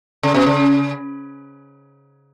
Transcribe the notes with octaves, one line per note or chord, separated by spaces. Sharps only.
C#3
B2
C#3